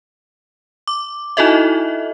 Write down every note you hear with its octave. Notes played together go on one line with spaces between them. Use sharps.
D6
D#4 E4 F#4 A4 D#5 E5